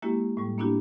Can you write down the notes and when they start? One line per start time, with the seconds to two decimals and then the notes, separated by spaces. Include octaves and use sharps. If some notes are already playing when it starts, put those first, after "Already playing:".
0.02 G#3 A#3 C#4 E4 F#4 G4
0.37 A2 G3
0.58 A#3 B3 D4 E4 F#4 G4